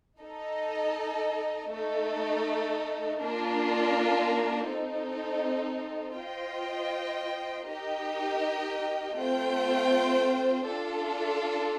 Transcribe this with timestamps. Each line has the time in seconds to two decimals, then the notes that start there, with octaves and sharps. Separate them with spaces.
0.20 D#4 A4 D#5
1.69 A3 D#4 A4
3.19 A#3 D4 F4 A#4
4.68 C4 D#4 A4
6.17 F4 C5 D#5 G5
7.67 D#4 G4 A#4 D#5 G5
9.16 A3 C4 F4 C5 G5
10.65 D4 F4 A4